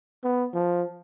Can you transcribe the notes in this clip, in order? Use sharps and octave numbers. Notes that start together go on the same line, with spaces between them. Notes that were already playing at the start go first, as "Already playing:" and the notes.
B3
F3